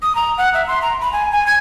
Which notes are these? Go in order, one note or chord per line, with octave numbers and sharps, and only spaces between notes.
D#6
A#5
F#5
E5
C6
A#5
B5
G#5
G#5
G#6